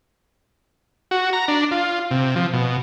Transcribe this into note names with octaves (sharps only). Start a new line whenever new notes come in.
F#4
A#5
D4
F4
C3
F3
B2